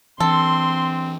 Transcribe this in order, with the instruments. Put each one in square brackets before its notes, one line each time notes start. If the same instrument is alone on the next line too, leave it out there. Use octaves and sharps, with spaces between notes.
[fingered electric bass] E3 D4 [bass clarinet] C4 [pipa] A4 [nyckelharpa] C6